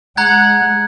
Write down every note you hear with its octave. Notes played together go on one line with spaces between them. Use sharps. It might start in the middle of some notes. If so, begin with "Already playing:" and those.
G#3 F#5 A#5 F#6 G#6